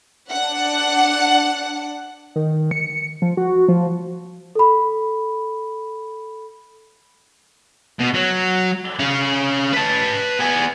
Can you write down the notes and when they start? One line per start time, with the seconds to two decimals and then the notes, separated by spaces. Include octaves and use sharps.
0.30 D4 F#5
2.36 D#3
2.71 C#7
3.22 F3
3.37 F#4
3.68 F3
4.55 A4 B5
8.00 B2
8.14 F#3
9.00 C#4 F5
9.73 B4 A5
10.40 B3 G#5